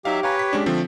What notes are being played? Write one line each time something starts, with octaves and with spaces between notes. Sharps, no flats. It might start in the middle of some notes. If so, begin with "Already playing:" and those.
F#3 D#4 G4 E5 F5
B4 C#5 F5 G#5 A#5
B6
G#3 C#4 D4
D3 F3 A3 C4